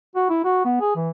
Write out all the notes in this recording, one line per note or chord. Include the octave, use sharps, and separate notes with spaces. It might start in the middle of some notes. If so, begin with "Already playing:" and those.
F#4
E4
F#4
B3
G#4
E3